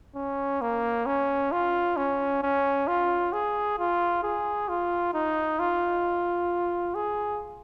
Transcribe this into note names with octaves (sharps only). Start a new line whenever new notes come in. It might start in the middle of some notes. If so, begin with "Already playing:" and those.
C#4
A#3
C#4
F4
C#4
C#4
F4
G#4
F4
G#4
F4
D#4
F4
G#4